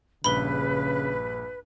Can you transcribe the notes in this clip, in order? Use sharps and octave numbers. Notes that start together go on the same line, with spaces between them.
A#1 G2 C#3 B4 B5 G7